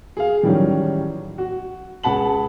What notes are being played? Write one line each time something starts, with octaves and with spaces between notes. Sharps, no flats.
G#4 F5
A2 D#3 E3 F#3 G3 C#4
F#4
C#2 G#4 F#5 A5 B5 F#7